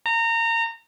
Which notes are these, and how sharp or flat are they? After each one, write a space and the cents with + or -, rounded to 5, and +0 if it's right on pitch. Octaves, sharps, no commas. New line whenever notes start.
A#5 -25